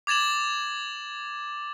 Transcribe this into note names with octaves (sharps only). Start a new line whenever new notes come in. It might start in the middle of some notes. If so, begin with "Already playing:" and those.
D6 G#6 A6 E7 F#7